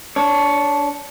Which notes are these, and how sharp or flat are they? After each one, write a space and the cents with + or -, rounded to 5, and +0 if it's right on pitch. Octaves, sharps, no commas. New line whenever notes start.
D4 -15 C#5 +5